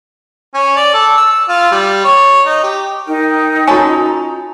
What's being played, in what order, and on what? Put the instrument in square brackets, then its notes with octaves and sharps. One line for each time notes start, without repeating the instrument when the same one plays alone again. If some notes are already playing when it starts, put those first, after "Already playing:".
[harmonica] C#4
D5
A4
E6
F4
G3
C#5
D#4
G4
[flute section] D#4 [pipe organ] A#4 G5
[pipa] C#4 A4 [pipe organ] F4 A#5 [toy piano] F#4 G#5